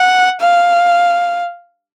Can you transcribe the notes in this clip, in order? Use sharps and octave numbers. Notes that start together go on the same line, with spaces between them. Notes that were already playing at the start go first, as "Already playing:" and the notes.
Already playing: F#5
F5